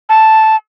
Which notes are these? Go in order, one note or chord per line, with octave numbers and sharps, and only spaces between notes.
A5